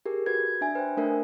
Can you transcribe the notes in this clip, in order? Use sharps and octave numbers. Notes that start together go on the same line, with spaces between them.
G4 G#4 A#4
F#4 B4 G#6
D4 E5 G#5
B4 C5 G5
A3 D4 A#4 E5 G#5